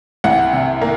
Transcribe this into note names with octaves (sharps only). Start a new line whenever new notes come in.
C2 F#5
C3
A#3